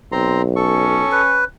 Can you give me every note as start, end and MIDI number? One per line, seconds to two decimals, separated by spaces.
0.12 1.04 35
0.12 0.42 60
0.12 0.42 82
0.12 0.42 84
0.56 1.44 61
0.56 1.22 69
0.56 1.22 85
1.12 1.45 71